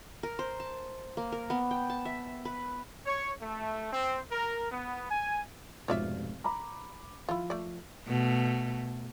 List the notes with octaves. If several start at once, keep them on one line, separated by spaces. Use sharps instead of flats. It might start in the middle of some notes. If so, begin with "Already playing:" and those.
A#4
C5
A5
A#3
A#4
B3
G5
A5
E5
B4
C#5
A3
C4
A#4
B3
G#5
F1 G#2 B2 F4 C#5 D5 E5
A#5 B5 D6
F3 E4 F4
A3 D5
B2 A3